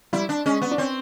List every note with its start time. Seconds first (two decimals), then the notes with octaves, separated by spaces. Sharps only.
0.13 G3 E4
0.29 D4
0.46 G#3 C#4
0.62 B3
0.71 D4
0.78 C4 C#4